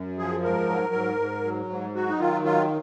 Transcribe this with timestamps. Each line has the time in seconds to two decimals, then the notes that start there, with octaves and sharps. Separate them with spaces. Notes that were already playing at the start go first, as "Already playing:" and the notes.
Already playing: F#2
0.18 F3 G#4
0.44 G#2 A#4
0.69 F#3
0.94 G#2
1.20 G#2
1.44 F#3
1.70 G#2
1.95 F#3 F#4
2.09 D#4
2.20 D#3 F4
2.45 F#3 F4